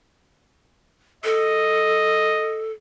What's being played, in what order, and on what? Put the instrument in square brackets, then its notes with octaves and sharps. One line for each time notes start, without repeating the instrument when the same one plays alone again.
[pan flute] A4 [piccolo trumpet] D#5